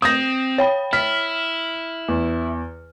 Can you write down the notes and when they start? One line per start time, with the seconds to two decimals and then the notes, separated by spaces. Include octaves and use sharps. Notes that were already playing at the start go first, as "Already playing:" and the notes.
0.02 C4 D#6 G6 A#6
0.58 C#5 G5 B5
0.93 E4 F6 B6
2.08 E2